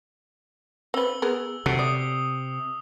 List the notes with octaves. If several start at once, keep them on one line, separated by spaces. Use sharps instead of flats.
C4 B4 E6 G7
B3 G#4 A#4
C3 F#3 A3
D5 D#6